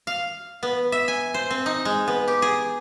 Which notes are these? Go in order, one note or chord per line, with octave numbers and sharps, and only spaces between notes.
F5
B3
E5
G#5
C5
C4
D#4
G#3
B3
G4
G#4